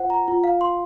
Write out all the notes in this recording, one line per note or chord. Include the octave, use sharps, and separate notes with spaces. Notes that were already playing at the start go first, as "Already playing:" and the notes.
Already playing: F4 C5 F#5
A#5
F4
F5
C6